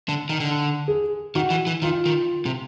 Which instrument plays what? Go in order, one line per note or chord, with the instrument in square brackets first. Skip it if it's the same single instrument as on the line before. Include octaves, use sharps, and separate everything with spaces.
[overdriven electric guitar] D3
D#3
D3
[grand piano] G#4
[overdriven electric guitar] D#3 [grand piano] F#4
[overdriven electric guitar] E3
E3
[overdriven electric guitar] D#3 [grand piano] F4
[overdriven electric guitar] D#3
C3